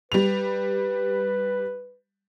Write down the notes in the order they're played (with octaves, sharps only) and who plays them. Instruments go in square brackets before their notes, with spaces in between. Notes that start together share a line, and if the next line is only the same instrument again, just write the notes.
[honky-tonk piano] G3 F7 [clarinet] B4